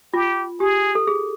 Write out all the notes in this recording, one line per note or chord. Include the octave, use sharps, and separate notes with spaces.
F4 G4
G4 G#4
A4
G#4